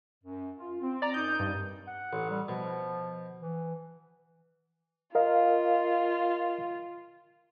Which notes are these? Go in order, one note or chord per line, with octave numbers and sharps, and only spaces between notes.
F#2
F4
C4
D5 A#5
F#2 D#4 D#6 G6
G2
F#5
A1
G3
B2 F3
E3
F4 A#4 D#5 F5